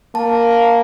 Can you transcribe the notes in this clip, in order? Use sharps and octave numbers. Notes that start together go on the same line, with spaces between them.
A#3 A5